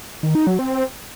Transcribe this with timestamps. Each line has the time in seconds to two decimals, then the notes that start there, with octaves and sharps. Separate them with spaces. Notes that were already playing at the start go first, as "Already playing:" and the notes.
0.23 D#3
0.35 D#4
0.47 F#3
0.59 C4